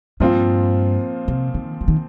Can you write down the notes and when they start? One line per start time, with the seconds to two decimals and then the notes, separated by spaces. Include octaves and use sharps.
0.20 G2 A#2 F3 C4 F4
1.28 C3
1.54 D#3
1.81 F3
1.88 D#3